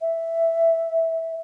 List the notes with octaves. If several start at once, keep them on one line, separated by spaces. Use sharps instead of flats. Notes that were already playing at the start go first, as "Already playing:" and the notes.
E5